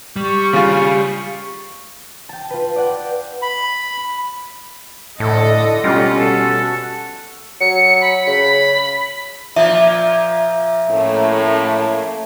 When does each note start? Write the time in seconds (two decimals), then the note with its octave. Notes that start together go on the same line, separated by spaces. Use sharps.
0.16 G3 C#6
0.53 C#3 F4
2.29 G5 A5
2.50 F4 B4
2.76 D5 F#5 G5
3.42 B5
5.20 A2 D3 A4 D#5
5.84 B2 G3 C#4 F4
6.18 F#4 A4
7.61 F#3 C#7
8.01 B5
8.27 C#3 B5
9.56 A#2 F3 E5
10.90 A2 A3 A#3 C#4